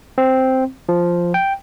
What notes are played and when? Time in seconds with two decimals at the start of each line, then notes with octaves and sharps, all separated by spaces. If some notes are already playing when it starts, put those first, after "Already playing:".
0.18 C4
0.89 F3
1.34 G5